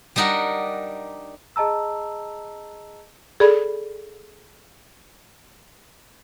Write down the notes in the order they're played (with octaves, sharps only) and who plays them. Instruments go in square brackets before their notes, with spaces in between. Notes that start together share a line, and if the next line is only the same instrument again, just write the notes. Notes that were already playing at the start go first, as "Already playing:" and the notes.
[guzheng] G3 D4 D#4 A#4 F#5
[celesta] G#4 D#5 A5 A#5 E6
[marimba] G#4 A4 D5 B5